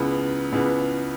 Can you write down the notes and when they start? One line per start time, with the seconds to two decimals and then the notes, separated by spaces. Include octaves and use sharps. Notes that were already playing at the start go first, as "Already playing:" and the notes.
Already playing: C#2 C#3 E3 B3 G#4 B4
0.52 C#2 C#3 E3 B3